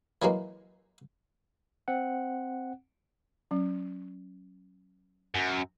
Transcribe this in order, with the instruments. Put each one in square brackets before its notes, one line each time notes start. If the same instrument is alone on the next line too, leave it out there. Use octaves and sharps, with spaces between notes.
[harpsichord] E3 F#3 G#3 A#3
[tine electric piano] C4 F#5
[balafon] F#3 C#4
[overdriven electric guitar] F#2